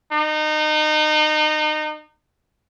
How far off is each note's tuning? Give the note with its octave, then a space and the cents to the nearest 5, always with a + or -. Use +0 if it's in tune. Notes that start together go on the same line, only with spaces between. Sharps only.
D#4 -25